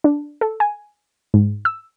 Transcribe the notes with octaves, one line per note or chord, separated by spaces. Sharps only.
D4
A4
G#5
G#2
E6